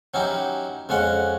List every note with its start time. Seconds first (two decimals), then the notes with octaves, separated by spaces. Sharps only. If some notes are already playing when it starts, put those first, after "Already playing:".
0.14 F#3 C#4 D#4 E4 G4
0.89 F2 G#3 C#4 F#5